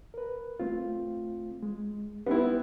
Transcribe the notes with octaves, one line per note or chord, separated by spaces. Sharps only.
A#4 B4
A3 C4 F4
G#3
B3 C4 E4 G4 B4